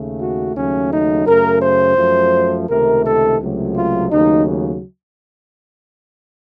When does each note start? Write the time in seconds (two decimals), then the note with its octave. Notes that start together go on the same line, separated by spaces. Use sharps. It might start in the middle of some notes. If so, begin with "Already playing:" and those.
Already playing: D#2 C#3 A3
0.20 F#4
0.55 D#2 C#3 F#3 A3 C#4
0.90 D#4
1.26 F#2 C#3 A3 A#4
1.62 C5
1.97 F#2 F3 A3
2.68 C#2 C3 D#3 A3 A#4
3.04 A4
3.40 C#2 C3 F#3 A3
3.76 F4
4.11 D#2 C#3 F#3 A3 D#4